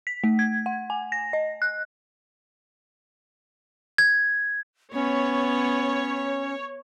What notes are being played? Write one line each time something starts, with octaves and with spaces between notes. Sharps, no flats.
B6
A3
G#6
F#5
G#5
A#6
D#5
F#6
G#6
B3 C#4 C#5